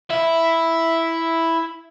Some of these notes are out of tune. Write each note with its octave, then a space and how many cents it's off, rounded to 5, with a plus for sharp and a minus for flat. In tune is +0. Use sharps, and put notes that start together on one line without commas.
E4 +0 E5 +0